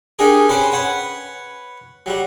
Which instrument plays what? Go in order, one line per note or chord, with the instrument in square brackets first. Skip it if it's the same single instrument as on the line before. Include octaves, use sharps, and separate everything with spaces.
[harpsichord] D4 D#4 G4 G#4 A#4
C#4 B4 C5 G5 B5 C6
B4 C#5 F#5
F#3 G3